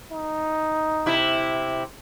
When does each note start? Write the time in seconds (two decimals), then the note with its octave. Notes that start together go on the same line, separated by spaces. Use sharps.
0.12 D#4
1.06 C3 E4